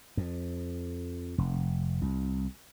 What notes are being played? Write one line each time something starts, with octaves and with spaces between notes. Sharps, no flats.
F2
F1
C2